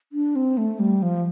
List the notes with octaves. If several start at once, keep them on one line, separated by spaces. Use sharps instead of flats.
D4
C4
A3
G3
F3